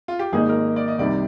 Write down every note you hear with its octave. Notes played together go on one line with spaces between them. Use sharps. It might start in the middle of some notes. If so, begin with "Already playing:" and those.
F4
G4
G#1 G#2 D#3 A#3 D#4 G#4
A#4
D5
D#5
C2 C3 D#3 D5